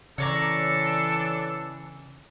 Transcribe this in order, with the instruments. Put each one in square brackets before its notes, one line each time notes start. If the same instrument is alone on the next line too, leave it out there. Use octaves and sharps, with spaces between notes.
[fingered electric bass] C#3 [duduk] E3 [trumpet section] D4 A4 [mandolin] C#5 D5 A#5